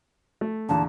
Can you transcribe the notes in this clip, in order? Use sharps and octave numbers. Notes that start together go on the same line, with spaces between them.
A3
E2 A#2 D3 A5